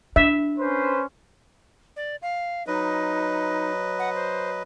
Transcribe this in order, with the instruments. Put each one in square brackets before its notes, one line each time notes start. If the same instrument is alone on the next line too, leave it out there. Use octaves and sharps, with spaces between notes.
[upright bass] D4 [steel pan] E5
[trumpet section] C#4 B4 C5
[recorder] D5
F5
[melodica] F#3 B4 D#5 [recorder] D#4
[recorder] F#5
C5